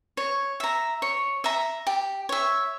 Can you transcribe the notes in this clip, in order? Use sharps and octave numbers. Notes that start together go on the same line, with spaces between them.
C#5
E5 A#5
C#5
E5 A#5
G4
C#5 E5